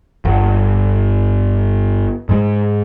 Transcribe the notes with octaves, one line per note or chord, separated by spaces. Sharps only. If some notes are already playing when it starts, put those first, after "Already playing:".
G1
G#2 G#3